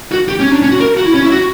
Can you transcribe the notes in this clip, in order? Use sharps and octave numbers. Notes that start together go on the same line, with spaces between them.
F#4
G4
C#4
D4
C#4
F#4
A#4
F#4
E4
C#4
E4
F#4